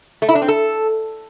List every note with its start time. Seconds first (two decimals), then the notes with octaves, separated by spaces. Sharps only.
0.22 A3
0.29 E4
0.35 D4
0.42 C4
0.48 A4